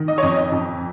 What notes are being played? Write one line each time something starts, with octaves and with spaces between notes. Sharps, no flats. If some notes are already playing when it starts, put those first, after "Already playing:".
Already playing: D#3
D#5
C#5
F2 D#5
F2